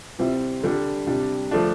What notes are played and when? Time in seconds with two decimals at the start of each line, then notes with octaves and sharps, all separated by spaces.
0.19 C3 G3 C4 E4
0.63 D3 G3 D4
1.07 C3 G3 D4
1.51 D3 F3 A3 D4